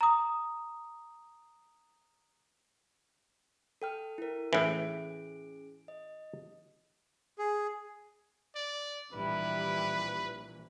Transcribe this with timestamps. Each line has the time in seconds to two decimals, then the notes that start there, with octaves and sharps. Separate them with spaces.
0.01 A#5 D#6
3.82 A4 G5 F6
4.18 E4 A#4
4.53 A2 E3 C#4 G#4 D7
5.88 D#5
7.39 G#4
8.55 D5
9.13 A#1 E3 G3 E4 G4 B4